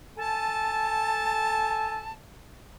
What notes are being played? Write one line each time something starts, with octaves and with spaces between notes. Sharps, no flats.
A4 G#5 A5